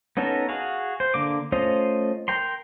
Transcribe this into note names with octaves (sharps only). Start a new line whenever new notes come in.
B3 C#4 D#4 A4 A#4
F#4 G#4 F5
C5
D3 A#3 D6
A3 C#4 F4 C5 D#5
A#4 G5 A#5 C6